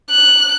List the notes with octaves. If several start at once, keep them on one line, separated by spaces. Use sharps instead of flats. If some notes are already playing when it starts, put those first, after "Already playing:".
F#6